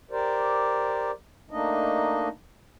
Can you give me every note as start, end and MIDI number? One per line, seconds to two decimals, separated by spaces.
0.11 1.11 67
0.11 1.11 70
0.11 1.11 72
0.11 1.11 74
1.51 2.28 57
1.51 2.28 58
1.51 2.28 62
1.51 2.28 63
1.51 2.28 75